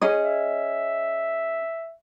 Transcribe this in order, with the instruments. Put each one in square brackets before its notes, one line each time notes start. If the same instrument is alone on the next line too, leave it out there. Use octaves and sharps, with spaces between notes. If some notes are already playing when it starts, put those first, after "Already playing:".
[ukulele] C#4 G#4 D#5
[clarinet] E5